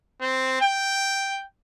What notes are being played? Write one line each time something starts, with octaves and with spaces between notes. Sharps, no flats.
C4
G5